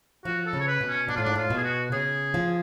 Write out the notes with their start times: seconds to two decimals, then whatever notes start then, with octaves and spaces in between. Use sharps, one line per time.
0.25 F3 F#4
0.46 A4
0.53 C#3
0.60 C#5
0.67 B4
0.81 B2
0.88 C#4
1.08 B2 D4
1.16 A2 F4
1.23 G#2 D4
1.35 A2 F4
1.50 B2
1.57 G#4
1.64 F#4
1.92 C#3 G#4
2.34 F3